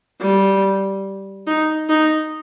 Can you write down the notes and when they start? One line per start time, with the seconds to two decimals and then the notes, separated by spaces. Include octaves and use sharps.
0.21 G3
1.47 D#4
1.89 D#4